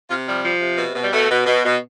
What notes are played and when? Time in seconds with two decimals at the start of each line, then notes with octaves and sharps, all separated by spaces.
0.09 C3 F4
0.26 F3 G3
0.44 F3
0.61 C3
0.77 B2
0.95 B2
1.03 G3
1.12 B2 A3
1.30 B2
1.46 B2
1.64 B2